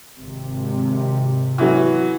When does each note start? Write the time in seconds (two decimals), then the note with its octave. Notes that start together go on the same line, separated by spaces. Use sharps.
0.18 G#1 C3
1.58 E3 F#3